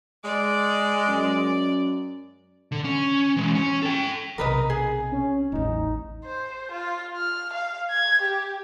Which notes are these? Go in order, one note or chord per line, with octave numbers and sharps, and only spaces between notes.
G#3 D5
F#2
D3
C#4
E3 G#3
C#4
A4 G5
B1 C3 A#4 B4 D#5
G#4
C#4
A1 E2 D#4
C5
F4
F6
F5
G#6
G4